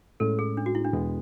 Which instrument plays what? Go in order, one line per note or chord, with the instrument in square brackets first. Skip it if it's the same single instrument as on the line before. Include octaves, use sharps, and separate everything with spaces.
[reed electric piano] A2 G#3 C#4 [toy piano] A4
[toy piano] G#4
D4
F#4
E4
D4
[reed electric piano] E2 B2 G#3 B3